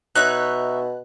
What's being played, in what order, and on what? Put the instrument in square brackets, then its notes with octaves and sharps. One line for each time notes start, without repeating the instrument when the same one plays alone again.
[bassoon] B2 [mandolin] D#4 C#5 E5 [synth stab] F#6